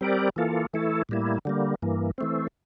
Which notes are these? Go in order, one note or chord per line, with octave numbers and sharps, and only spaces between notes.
G3 C4 G4 A#4 D5
E3 A#3 F4 A4
E3 A3 E4 A4
A2 G3 A#3 E4
D3 G3 A#3
G2 E3 A#3
E3 A3 C4